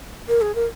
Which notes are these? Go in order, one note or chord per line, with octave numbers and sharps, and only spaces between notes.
A#4
G#4
A#4